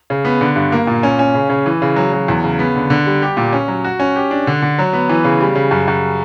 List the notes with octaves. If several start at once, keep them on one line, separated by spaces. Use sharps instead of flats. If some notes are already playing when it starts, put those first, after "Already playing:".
C#3
B3
D3
G2
A#3
A#2
C#4
C#4
C#3
C#3
E3
C#3
F#3
F#3
E2
C#3
B3
D3
D3
G3
G4
A#2
C#4
F#3
F#4
C#4
G4
D4
D3
D3
F#3
B3
E3
C#3
G3
C#3
F#2
F#2